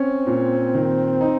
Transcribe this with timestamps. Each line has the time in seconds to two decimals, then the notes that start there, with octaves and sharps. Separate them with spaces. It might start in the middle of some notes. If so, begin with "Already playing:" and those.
Already playing: C4 C#4
0.27 A#2
0.74 D#3
1.21 D#4